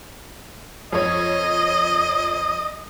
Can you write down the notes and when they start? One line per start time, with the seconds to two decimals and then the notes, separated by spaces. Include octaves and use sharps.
0.93 F2 C#5 D#5